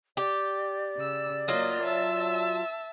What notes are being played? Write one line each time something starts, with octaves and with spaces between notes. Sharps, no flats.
G4 D5
C#3 E6
F#3 A#3 F4 D#5
E5 A5 E6